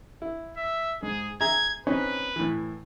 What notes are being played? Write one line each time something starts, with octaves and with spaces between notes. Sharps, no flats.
E4
E5
G#2 G#4
G#4 E5 A#5 G#6
C4 C#4 D#4 B4
A2 E3